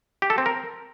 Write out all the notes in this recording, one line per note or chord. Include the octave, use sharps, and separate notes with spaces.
G4
A4
C4
A#4